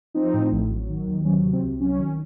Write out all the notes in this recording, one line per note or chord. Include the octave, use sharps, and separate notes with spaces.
F3 C4 D#4
A2
A1
F#3
D#3
D#2
F#3 C#4
C3
C4
C2
F#3 C#4
D#3